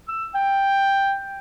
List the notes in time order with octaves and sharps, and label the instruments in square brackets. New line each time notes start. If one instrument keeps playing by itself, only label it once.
[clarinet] E6
G5